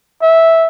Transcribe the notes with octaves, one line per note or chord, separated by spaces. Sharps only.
E5